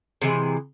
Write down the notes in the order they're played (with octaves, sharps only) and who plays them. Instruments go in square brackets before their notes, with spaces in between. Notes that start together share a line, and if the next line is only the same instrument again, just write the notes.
[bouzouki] C3 E3 G#3